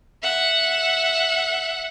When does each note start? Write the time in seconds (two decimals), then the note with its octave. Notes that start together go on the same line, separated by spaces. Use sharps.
0.23 E5 F#5